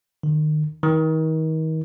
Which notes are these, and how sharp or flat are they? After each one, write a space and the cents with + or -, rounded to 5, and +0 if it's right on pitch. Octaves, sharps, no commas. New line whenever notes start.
D#3 -30
D#3 +35